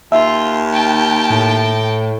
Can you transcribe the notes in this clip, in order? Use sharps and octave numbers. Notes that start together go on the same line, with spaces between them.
D#2 F4 E5
G5 A5
A2